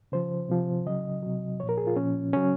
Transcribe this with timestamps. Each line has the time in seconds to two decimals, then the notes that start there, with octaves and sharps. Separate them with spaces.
0.12 C#3 F3 C5
0.49 C3 F3
0.86 C#3 F#3 D#5
1.23 C3 F#3
1.60 A#2 F3 C#5
1.69 A#4
1.78 G#4
1.87 F4
1.96 A#2 F3 C#4
2.33 C#3 F#3 C#4